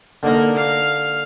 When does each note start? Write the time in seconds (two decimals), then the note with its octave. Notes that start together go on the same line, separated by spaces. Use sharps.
0.23 D3 A#3 D#4 A#4
0.57 F5